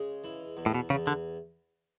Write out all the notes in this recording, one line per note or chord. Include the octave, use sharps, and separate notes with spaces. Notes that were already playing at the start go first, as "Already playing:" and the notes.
Already playing: C#3 G#3
E3
E2
A2
B2
E2 C#3
D3